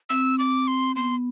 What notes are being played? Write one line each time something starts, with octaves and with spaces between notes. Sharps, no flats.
C4 E6
D6
C6
B3 C6